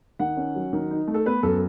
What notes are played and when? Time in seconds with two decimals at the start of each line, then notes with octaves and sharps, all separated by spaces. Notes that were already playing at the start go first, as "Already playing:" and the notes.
0.19 D#3 F#5
0.37 C#4
0.55 F#3
0.73 D#3
0.91 D#4
1.07 A3
1.14 A4
1.26 B3 B4
1.43 F#2 A4